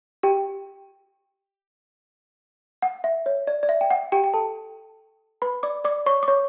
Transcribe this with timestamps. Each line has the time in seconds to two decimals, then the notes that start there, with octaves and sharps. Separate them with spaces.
0.23 G4 G5
2.82 F#5
3.04 E5
3.26 C#5
3.47 D5
3.63 D5
3.69 E5
3.81 G5
3.91 F#5
4.12 G4 G5
4.24 G5
4.34 A4 A5
5.42 B4 B5
5.63 D5 D6
5.85 D5 D6
6.06 C#5 C#6
6.23 D6
6.28 C#5 C#6